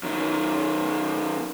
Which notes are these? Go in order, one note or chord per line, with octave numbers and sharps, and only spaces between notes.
F#2 D#3